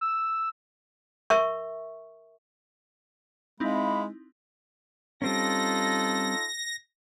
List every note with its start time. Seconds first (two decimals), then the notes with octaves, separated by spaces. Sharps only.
0.01 E6
1.30 A#4 E5 C#6
3.60 G#3 C4 D#4 E4 E5 F5 B5
5.22 G3 C4 C#4 D#4 F4 A4 A#6